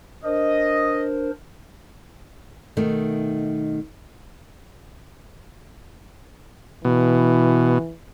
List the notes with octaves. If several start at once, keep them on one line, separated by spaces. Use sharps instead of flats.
D4 A#4 C5 D#5
B2 D#3 A3
B2 E3